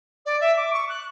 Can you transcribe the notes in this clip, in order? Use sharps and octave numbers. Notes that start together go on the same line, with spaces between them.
D5
E5
D6
C#6
F#6